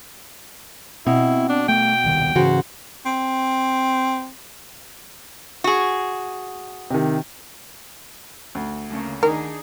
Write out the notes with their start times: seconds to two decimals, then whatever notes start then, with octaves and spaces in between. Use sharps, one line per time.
1.07 B2 C4 E4
1.49 D4
1.69 A3 B3 G5
2.04 D#1 C2 D#3
2.35 G#2 C#3 E3 F#4 C5
3.06 C4
5.64 F#4 G#4
6.91 C3 D#3
8.55 D2
8.89 C#3 A3 A#3
9.23 D#3 D4 D#4 G#4 A#4